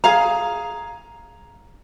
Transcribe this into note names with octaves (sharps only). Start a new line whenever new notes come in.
G#4 F5 A#5